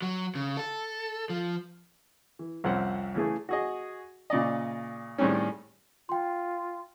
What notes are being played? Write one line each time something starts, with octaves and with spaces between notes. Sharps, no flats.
F#3
C#3
A4
F3
E3
C2 F2 C4 C#4 F#5
C#3 E3 A3 G#4
F#4 G#4 D#5
A#2 C#3 D5 D#5
A2 D#3 G3 G#3 C4 C#4
F4 G5 C6